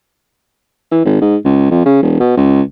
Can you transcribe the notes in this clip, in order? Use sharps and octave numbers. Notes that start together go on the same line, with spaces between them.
E3
G#1
G#2
C#2
F2
C#3
E1
B2
C#2